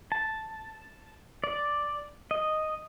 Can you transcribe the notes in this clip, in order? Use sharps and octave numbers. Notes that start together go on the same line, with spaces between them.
A5
D5
D#5